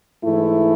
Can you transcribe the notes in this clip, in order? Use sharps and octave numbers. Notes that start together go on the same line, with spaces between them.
G#2 E3 A3 E4